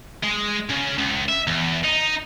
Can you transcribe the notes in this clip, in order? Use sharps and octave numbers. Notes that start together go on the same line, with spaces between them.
G#3
C#3
C#2
E5
E2
D#4